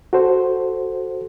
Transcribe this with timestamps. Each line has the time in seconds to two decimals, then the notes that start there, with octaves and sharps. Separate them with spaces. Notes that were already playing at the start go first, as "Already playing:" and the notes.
0.13 F#4 A4 C5